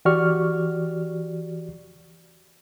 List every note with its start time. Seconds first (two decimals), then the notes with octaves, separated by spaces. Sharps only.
0.05 E3 F#4 G4 D5 C#6 F6